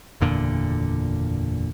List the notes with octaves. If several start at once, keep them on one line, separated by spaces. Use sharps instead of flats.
F#1 E2 A#2 D3